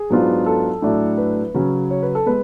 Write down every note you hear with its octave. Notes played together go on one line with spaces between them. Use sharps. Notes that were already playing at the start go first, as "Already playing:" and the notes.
Already playing: G#4
G#2 F#3 B3 D4 F4
A4
A2 F#3 A3 D4
B4
C#3 F#3 C#4
C#5
B4
A4
G#3 B3 B4